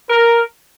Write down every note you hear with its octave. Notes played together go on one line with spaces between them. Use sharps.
A#4